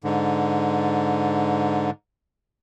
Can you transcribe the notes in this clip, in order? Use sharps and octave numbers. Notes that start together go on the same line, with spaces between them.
G#2 D3